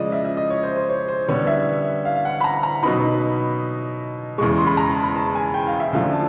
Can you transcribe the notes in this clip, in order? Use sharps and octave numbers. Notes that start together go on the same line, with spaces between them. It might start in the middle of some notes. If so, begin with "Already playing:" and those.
Already playing: C#3 F3 G#3 D5 D#5
E5
E5
D#5
C#5
C5
C5
C#5
C5
D3 G3 B3 C#5
E5
F5
F5
F#5
B5
A#5
A#5
B2 F#3 B3 D#4 B5
E2 C#3 E3 G#3 C#6
C6
B5
A#5
A5
B5
A5
G#5
G5
F5
E5
F#2 D3 F3 A3 F5
A5